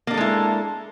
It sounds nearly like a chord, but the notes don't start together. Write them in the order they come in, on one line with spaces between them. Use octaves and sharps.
A#3 D4 A4 G#3 E4